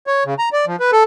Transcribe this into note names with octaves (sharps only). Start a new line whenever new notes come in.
C#5
C#3
A#5
D5
F3
B4
A4